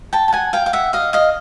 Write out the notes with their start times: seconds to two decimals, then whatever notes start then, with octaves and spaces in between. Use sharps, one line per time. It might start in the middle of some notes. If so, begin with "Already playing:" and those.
0.13 G5 A5
0.28 A5
0.32 F#5 G#5
0.53 F5 G5
0.66 F5
0.73 E5 F#5
0.93 D#5 F5
1.13 D#5 F5